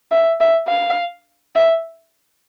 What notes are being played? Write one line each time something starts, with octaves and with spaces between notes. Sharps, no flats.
E5
E5
F5
E5